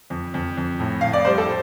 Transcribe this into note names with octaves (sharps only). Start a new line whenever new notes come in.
F2
F2
F2
A2
A2 F5
D5
G3 C5
A4